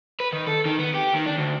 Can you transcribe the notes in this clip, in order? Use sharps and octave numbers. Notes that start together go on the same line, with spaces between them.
B4
D#3
A4
D#3
B3
G4
D#3
D4
D2